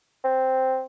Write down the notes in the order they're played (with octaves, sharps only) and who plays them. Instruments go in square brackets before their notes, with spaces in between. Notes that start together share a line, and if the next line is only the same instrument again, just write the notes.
[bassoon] C4